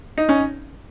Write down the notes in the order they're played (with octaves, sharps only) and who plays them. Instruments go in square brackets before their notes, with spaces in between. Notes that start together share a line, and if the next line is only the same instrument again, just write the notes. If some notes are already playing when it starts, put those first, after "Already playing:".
[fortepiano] D#4
C#4